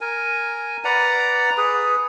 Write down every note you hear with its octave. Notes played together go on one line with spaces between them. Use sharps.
A#4 G#5
B4 D5 F#5 A#5
G#4 B4